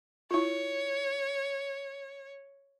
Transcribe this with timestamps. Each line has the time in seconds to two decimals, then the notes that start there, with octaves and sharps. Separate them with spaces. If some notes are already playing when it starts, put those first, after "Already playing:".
0.31 E4 F4 C#5